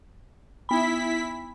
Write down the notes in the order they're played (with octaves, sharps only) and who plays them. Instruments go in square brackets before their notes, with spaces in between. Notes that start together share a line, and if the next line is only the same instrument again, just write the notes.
[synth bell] B3 B5 [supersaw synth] E4 B6